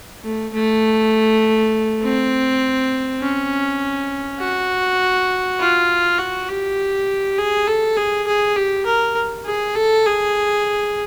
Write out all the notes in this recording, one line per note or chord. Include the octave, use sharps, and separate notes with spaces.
A3
A3
C4
C#4
F#4
F4
F#4
G4
G#4
A4
G#4
G#4
G4
A#4
G#4
A4
G#4